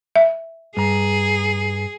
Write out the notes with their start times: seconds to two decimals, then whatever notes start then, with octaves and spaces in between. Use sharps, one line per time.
0.15 E5
0.77 G2 G#4 A#5